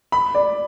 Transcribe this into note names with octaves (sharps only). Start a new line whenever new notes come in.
B5
D5